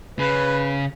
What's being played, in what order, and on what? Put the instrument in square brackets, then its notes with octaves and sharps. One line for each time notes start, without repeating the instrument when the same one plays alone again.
[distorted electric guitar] C#3 [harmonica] B4